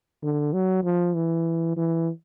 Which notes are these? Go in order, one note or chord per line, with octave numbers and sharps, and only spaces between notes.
D3
F#3
F3
E3
E3